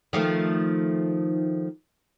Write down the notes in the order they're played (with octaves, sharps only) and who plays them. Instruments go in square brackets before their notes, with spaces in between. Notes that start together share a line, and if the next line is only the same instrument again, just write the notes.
[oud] D#3 F3 A3